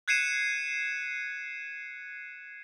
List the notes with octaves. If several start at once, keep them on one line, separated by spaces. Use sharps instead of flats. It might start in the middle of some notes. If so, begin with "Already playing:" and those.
F#6 G#6 C7 C#7 D#7 E7